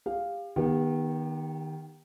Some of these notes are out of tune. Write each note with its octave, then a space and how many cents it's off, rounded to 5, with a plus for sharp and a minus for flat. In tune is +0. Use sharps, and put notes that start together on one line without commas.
G4 +35 F5 +0
D#3 +0 B3 -35 G4 +25